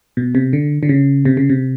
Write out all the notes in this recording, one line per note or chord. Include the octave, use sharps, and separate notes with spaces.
B2
C3
D3
D3
C#3
C3
C#3
C3